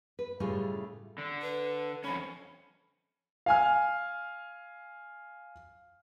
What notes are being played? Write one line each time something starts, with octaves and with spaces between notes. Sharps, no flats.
B4
A2 C#3 G3 A3 F4 G#4
D3
B4
F2 C#4 B5
F5 G#5 F6